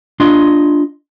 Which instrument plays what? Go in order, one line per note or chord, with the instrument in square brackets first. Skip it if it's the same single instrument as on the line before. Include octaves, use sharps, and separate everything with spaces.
[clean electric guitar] D4 F4 D#5 C6